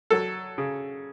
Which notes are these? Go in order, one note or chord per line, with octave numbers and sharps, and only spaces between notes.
F#3 A4
C#3